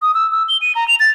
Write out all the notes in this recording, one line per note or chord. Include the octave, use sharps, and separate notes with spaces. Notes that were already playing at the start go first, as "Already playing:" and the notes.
D#6
E6
E6
G7
D#7
A#5
F7
A6